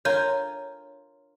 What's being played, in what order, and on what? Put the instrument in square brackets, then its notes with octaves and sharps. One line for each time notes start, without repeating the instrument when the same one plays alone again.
[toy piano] D4 C#5 [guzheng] F4 A#4 G#5